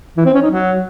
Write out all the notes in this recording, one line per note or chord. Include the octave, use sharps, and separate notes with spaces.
E3
C4
C#4
D#4
F#3